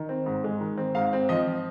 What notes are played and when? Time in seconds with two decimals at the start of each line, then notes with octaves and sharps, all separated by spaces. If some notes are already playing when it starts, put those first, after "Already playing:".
Already playing: D#3
0.09 C4
0.26 G#2
0.44 G#3
0.60 D#3
0.77 C4
0.95 G#2 F5
1.13 C4
1.29 F3 D#5